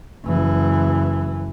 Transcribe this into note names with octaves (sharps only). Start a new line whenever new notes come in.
F#1 E3